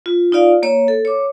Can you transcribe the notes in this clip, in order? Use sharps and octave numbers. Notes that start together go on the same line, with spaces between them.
F4
D#4 F4 D5 F5
A#3 C#5
A4
C#5 D6